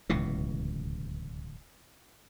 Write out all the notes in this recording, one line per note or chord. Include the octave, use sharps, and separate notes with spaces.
D1 C#2 B2 E3